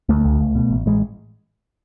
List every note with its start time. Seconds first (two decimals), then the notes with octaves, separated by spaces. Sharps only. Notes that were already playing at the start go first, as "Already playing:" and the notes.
0.09 D2 A3
0.25 C#2
0.40 C#2
0.55 B2
0.71 A1
0.86 A1 G#3